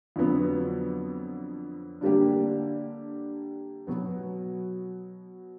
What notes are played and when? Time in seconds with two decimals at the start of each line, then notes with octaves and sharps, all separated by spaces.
0.16 F2 D3 F#3 B3
2.01 D3 G3 A#3 D4 G4
3.87 B2 F#3 B3